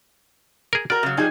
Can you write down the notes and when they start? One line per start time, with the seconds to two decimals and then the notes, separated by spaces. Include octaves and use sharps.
0.73 G#4 A#4
0.90 F#4 A#4 D5 F6
1.03 C#3 F#3
1.17 F3 G3 D#4 G#4 G#5